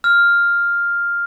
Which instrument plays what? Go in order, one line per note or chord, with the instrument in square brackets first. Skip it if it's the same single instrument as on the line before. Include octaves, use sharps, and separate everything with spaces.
[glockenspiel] F6